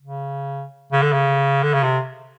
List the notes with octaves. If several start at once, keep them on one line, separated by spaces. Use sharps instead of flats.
C#3
C#3
D3
C#3
D3
C#3
C3